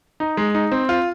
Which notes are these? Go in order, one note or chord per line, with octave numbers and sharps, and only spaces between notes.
D#4
G#3
D#4
C4
F4